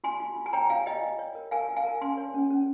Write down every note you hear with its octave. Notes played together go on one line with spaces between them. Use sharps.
F4 G#5 C6
F4
F4
G#5
C#5 G5 A#5
F4 F5 G#5
F4 D#5 G5
F4
C#5
A#4
A#4 F5 G#5
F4
F5 G#5
A#4
C#4 G#5 C6
C#5
C#4
C#4